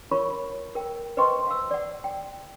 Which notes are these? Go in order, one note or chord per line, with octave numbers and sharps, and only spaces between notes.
F4 A#4 C#5 B5 C#6
A#4 G5
B4 C5 D#5 G5 C6 C#6
F5 E6
D5 F#5
G5